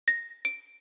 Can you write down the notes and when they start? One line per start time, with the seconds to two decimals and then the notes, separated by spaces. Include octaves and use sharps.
0.08 A#6
0.45 D7